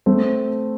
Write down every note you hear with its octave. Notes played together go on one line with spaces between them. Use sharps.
A3 C4